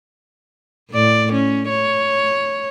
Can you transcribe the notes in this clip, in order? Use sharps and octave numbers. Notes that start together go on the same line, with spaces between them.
A2 D5
C#4
C#5